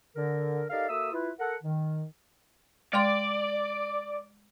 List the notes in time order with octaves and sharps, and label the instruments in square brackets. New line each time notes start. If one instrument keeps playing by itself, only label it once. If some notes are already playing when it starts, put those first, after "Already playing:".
[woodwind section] D3 A#4
D#4 G4 A4 A#4 D5 F5
A#3 F#4 A4 E5 D#6 E6
E4 F4 B4
A4 A#4 F#5
D#3
[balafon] G#3 G5 C6 [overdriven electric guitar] D5